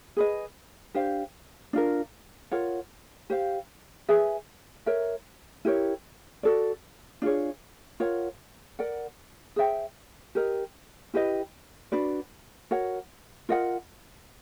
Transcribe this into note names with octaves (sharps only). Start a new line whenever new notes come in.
G#4 B4 D#5
D4 G4 C5 F5
D4 F4 A#4
F4 A#4 C#5 F#5
G4 C5 F5
G#4 B4 E5 G#5
A#4 C#5 E5
E4 G4 A#4 C#5
F#4 A4 D5
D4 F4 G#4 C#5
F4 A#4 C#5 F#5
A#4 D5 F#5
G#4 C5 E5 G5
G4 A#4 D#5
E4 G4 B4 D#5
D4 F#4 B4 D5
F#4 A#4 C#5 F#5
F4 A#4 D#5 F#5